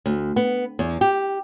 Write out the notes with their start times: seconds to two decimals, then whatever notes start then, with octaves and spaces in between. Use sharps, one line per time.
0.06 D2
0.36 B3
0.79 E2
1.01 G4